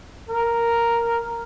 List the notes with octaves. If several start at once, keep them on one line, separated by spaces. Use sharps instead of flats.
A#4